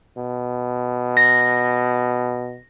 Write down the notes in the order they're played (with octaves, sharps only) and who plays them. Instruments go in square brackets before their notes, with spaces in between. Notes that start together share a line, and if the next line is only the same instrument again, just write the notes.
[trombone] B2
[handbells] A#6